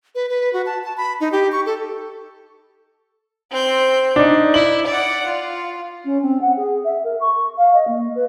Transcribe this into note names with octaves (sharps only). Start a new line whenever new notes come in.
B4
B4
F#4
A5
A5
B5
D#4
G4
C#6
A4
C4 G6
D4 D#4
E4 F#7
D5 F#5
F4
C#4
C4
F#5
G#4
E5
A#4
C#6
F5
D#5
A#3
B4